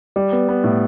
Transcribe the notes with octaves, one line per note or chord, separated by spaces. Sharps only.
G3
B3
B3
A2